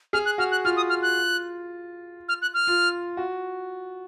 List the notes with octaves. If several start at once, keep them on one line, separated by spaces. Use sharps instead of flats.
G#4 F6
F#6
F#4 F6
F#6
F4 F6
D#6
F6
F#6
F6
F#6
F6
F4
F#4